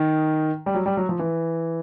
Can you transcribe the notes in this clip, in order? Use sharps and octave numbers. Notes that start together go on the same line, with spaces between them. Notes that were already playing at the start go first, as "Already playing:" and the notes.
Already playing: D#3
G3
F#3
G3
F#3
F3
E3